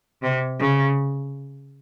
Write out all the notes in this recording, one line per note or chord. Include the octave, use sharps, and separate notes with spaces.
C3
C#3